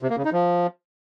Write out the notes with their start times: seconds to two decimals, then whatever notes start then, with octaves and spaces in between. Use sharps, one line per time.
0.02 C3
0.10 A#3
0.17 C#3
0.25 D#4
0.32 F3